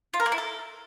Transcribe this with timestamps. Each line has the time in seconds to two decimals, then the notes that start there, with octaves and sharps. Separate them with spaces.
0.14 F4
0.20 A#4
0.26 A#3
0.32 E4
0.38 A4